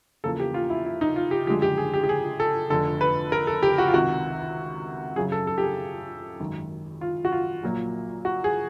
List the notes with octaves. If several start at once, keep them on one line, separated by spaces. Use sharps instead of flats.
E2 C#3 F3 A#3 A4
G4
F4
E4
E4
D#4
F4
G4
F#2 D3 F3 G#3 G4
G4
G#4
G4
G4
G#4
A4
F1 F2 D3 A4
B4
A#4
A4
G4
F#4
F4
C#2 C3 D#3 F#4
F#2 C#3 F#3 G#4
A4
A4
G4
G#4
G#1 F#2 D#3
F4
F#4
F4
A#1 A#2 F#3 A#3
F#4
G#4